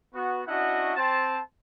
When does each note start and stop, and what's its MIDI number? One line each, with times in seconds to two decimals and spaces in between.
0.14 0.42 59
0.14 0.42 66
0.47 0.92 61
0.47 0.92 62
0.47 0.92 64
0.47 0.92 66
0.47 0.92 75
0.47 0.92 78
0.96 1.39 60
0.96 1.39 72
0.96 1.39 81